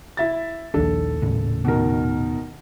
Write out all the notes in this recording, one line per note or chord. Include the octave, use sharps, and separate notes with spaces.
E4 E5 A6
A#1 D#2 D4 A4
D#1 A2 C#3
B2 D#3 A#4